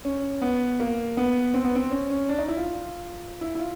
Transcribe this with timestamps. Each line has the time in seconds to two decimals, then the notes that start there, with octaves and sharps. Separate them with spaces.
0.05 C#4
0.42 B3
0.80 A#3
1.17 B3
1.54 C4
1.65 B3
1.75 C4
1.91 C#4
2.10 C#4
2.29 D4
2.39 D#4
2.48 E4
2.57 F4
3.41 E4
3.55 E4
3.60 F4